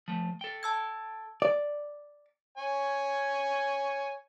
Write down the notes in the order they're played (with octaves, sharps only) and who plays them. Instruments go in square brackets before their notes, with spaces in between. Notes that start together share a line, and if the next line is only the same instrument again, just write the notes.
[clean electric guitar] F3 A3
A4 G5
[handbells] A5 E6 G#6
[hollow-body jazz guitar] D5
[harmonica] C#5 G#5